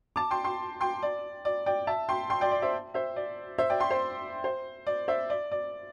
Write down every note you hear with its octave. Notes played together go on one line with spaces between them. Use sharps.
A5 D6
G5 C6
G5 C6
G5 C6
D5
D5
D5 G5
E5 A5
G5 C6
G5 C6
D5 G5
D5
C5 E5
C5 E5
D5
C5 E5
D5 G5
G5 C6
C5
C5
D5
C5 E5
D5
D5